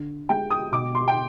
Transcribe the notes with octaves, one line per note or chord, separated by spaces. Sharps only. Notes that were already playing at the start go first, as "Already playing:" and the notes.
Already playing: D3
G#3 G5
D#6
B2 D6
C6
G5